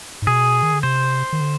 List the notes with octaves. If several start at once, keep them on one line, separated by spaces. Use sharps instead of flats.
G#2
B2 G#4
D#3
D3
C3 C5
D#3
D3